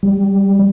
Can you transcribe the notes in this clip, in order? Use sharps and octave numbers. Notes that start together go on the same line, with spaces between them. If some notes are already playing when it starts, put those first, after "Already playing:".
G3